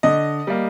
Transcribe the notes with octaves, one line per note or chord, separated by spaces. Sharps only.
D3 D#5
G3 A#3